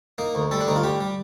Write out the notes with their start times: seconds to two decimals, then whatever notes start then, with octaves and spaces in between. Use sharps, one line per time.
0.18 A#3 D#4
0.35 D2
0.51 G3 A4
0.61 D4
0.68 D2 D#4
0.76 F4
0.84 G3 G4
1.01 G3